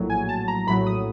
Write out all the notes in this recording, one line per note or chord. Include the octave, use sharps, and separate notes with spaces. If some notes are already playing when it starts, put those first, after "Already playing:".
Already playing: A#1 A2 F#3
G#5
A5
A#5
A#1 A2 F#3 B5
D#6